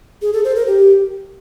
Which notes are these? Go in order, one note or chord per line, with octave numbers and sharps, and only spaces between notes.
G#4
A4
C5
A#4
G4